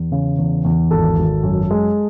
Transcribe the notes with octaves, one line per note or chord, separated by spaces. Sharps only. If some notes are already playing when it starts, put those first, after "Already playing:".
Already playing: E2
C#3
E2
E2
G#1 A4 A5
G#1
F#2
G#3